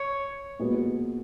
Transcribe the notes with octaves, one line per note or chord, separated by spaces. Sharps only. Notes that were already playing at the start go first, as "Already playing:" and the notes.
Already playing: C#5
A#2 G#3 B3 F#4 B4